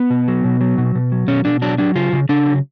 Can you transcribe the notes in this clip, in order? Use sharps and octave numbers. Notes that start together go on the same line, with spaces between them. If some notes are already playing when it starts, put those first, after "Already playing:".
Already playing: B3
B2
F#3
B2
F#3
B2
B2
F#3
B2 C#4
B2 D4
F#3 D4
F#3 D4
C#3 F4
C#3
C#3 D4
F#3